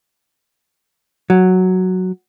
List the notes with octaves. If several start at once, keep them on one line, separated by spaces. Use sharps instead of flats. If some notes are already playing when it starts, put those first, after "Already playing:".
F#3